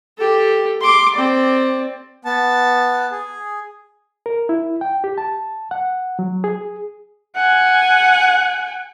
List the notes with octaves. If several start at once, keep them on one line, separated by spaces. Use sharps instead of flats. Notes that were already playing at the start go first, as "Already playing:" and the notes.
G4 A4
C6 D6
C4 D5
B3 A5
G#4
A#4
E4
G5
G4
A5
F#5
F#3
G#4
F#5 G#5